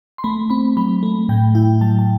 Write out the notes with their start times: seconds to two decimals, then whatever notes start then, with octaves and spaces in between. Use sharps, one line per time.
0.18 C6
0.24 A3 B5
0.50 C4 B5
0.77 F#3 B5
1.03 A3
1.29 A2 G5
1.55 E4 G5
1.81 F#3 A5
1.99 A5